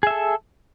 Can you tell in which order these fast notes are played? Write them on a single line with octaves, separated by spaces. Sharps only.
G#4 E5 A4